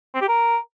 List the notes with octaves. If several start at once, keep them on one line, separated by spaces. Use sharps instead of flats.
C4
G4
A#4